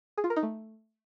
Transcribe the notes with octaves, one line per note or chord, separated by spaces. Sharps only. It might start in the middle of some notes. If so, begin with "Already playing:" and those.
G#4
F4
A#4
D#4
A3